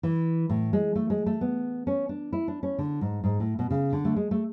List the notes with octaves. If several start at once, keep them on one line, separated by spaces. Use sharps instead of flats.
E3
A2
G#3
A3
G#3
A3
B3
C#4
D4
E4
D4
C#4
D3
G#2
G#2
A2
B2
C#3
D3
A3
G#3
A3